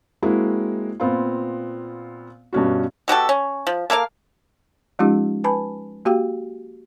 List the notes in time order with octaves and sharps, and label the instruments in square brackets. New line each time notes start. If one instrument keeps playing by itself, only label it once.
[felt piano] G#3 A#3 C4 E4 F#4
A#2 B3 C4 F4
G2 B2 C#4 F#4
[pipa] B2 F#4 G4 A4
C#4
F3
A#3 A4 A#4 F5
[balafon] F3 G#3 C#4 D#4 F4 G4
B4 G#5 A5 B5
A#3 F#4 G4 F5 G5